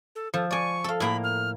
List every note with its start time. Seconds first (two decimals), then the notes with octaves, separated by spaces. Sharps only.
0.15 A4
0.34 F3 A4
0.51 D5 G#5 C#6
0.84 A4 F5
1.00 A2 A#3 A#5 B5
1.24 F6